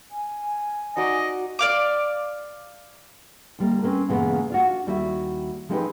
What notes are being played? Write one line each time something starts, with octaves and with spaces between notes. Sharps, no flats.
G#5
D#4 F#4 D5 D#5
D5 F5 D6
D2 G3 A#3
C4 C#4 A#4 B4
G2 A#2 C#3 E3 G#3 B3
D4 F4 F#4
D#2 G3 E4 F#4 E5
F3 G#3 C4 D#4 G4 B4